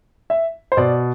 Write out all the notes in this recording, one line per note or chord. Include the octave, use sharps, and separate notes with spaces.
E5
C5
B2 D5